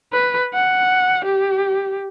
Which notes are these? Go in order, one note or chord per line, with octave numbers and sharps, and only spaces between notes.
B4
F#5
G4